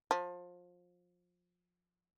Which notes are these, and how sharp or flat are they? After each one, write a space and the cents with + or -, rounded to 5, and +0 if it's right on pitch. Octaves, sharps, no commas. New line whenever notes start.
F3 +25